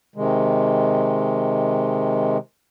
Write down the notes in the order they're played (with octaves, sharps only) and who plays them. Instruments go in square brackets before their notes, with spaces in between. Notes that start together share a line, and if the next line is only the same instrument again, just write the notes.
[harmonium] C3 D#3 G#3